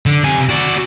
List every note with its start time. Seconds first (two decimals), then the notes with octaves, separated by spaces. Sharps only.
0.06 D3
0.24 C3 G#5
0.49 F#4 D5